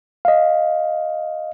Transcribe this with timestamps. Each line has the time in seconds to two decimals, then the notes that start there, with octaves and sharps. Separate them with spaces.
0.25 D#5 F5